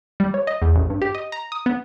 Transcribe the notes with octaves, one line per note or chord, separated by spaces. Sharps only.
G3
C#5
D#5
E2
A1
G2
G4
D#5
A#5
D#6
B3